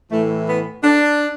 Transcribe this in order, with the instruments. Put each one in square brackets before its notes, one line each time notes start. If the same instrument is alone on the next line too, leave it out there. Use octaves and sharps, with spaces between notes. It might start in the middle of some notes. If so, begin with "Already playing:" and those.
[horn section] A2 E3 A3
B3
D4